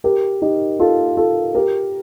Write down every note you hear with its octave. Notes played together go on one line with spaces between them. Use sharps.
G4 A#4
D#4 G4
F4 A4
F4 A4
G4 A#4